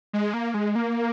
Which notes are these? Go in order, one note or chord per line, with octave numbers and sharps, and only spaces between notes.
G#3
A#3
G#3
A#3